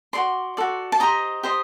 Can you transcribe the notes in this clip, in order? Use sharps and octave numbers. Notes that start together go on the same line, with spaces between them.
F#4 A4 D5 C6
F#4 A4 D5
A5
G4 C5 D#5 A#5
G4 C5 D#5